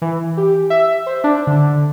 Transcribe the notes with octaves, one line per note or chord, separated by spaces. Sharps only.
E3
G4
E5
C5
D4
D3